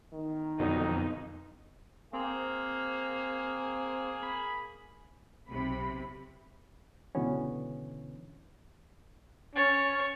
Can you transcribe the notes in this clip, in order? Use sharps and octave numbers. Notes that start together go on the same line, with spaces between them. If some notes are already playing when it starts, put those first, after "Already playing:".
E2 D#3
F2 B2 D3 F#3 B3 D#4
A#3 C4 G#4
B5
B1 C3 B5
C#2 B2 D3 E3 B3 C#4
C#4 C#5 A6